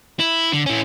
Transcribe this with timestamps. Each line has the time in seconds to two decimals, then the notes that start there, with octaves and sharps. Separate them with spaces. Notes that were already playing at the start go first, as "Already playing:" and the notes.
0.19 E4
0.52 D3
0.66 E3 C#4